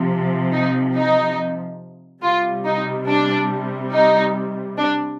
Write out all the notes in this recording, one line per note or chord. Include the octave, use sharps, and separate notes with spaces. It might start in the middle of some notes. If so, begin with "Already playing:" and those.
Already playing: C3 F3
D#4
D#4
C3 G3 F4
D#4
D4
D#4
D4